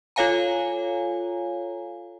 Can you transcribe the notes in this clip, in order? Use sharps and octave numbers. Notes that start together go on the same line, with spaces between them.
F4 A4 C#5 F5 G#5 A#5